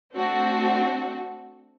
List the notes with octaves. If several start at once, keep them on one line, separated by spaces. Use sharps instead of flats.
A3 C4 D4 F#4